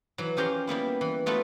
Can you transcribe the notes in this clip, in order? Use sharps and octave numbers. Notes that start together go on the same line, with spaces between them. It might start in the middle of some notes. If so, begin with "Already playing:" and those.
E3 F#3
F3 C#4 G4 A#4 A#5 C6
G3 A#3 B3 E4
E3
F#3 A3 B3 F4 F#4